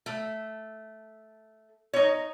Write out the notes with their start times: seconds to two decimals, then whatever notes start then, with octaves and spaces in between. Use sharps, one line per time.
0.06 A3
1.93 D#4 C#5